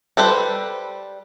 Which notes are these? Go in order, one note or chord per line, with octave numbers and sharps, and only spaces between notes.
G3 A4 B4 C5